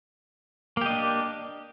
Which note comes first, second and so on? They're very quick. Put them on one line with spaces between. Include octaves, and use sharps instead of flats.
A#3 G4 D#5 D4